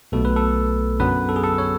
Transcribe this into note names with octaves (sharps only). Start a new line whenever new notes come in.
B1 B2 A3 A4
B4
A4
F#2 D3 F#3 B3 B4
A4
G#4
A4
C#5